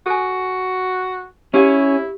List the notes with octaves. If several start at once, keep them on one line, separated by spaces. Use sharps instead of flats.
F#4 A4 G#5
C#4 E4 G4 G#4 F5